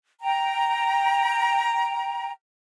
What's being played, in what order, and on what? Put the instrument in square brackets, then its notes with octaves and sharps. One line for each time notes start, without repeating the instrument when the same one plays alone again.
[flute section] G5 A#5